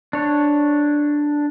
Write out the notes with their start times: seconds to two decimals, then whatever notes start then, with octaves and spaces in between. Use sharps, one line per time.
0.13 D4 C#5